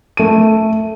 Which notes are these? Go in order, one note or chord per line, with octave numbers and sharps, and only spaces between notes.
A3 D#7